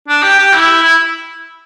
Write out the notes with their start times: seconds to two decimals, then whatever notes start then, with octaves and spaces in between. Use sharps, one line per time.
0.08 D4
0.23 G4
0.38 G4
0.53 E4
0.83 E4